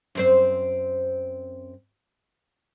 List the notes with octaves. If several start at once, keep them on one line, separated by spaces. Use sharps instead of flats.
F#2 C4 C5